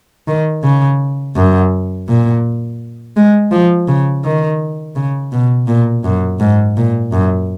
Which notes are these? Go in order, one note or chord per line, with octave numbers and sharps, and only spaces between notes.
D#3
C#3
F#2
A#2
G#3
F3
C#3
D#3
C#3
B2
A#2
F#2
G#2
A#2
F#2